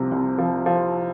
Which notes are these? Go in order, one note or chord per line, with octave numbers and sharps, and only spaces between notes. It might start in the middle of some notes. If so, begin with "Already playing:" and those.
Already playing: C2 C3 F3
C2
F3
F3